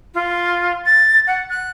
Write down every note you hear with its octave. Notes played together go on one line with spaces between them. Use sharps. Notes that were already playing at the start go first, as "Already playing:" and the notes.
F4
A6
F#5
F#6